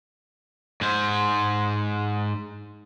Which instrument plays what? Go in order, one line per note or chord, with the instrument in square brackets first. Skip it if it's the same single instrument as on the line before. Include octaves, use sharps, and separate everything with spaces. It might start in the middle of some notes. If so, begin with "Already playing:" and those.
[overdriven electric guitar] G#2 C5